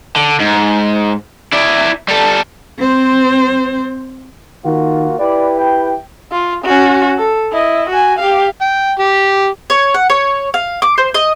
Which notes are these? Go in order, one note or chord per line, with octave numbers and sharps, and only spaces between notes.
D3
G#2
E4 D5
G3 A4
C4 C5
D#3 A#3 F4 F#4
E4 G4 B4 D5
G5
F4
C#4 F#4
A4
E4 D#5
F#4 G#5
G4 F5
G5
G4
C#5
F#5
C#5
F5
D6
C5
D#5